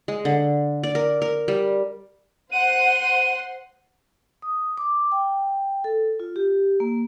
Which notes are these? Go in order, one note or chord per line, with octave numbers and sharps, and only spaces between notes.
G#3
D3
D5
A#4
A#4
G3
C5 F#5 C6 D#7
D#6
D6
G5
A4
F4
G4
A#3